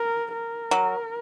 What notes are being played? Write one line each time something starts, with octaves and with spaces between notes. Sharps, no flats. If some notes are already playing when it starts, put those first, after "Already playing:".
Already playing: A#4
A#4
F#3